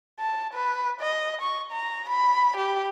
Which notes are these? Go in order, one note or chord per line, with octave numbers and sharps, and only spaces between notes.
A5
B4
D#5
C#6
A#5
B5
G4